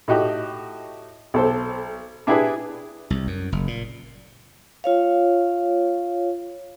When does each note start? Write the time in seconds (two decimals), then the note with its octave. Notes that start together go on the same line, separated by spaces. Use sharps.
0.08 A2 D#4 F#4 G4
1.34 B1 A4 C5
2.27 D4 E4 G4 G#4 B4
3.10 C2
3.27 F#2
3.52 F#1
3.67 A#2
4.84 F4 C#5 F5